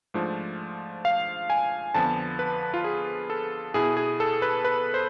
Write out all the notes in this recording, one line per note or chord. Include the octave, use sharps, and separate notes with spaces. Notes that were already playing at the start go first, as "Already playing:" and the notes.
G#2 F3 A3 D4
F5
G#5
F2 D3 F3 B3 A5
B4
F4
G#4
A4
B2 B3 E4 G#4
G#4
A4
B4
B4
C5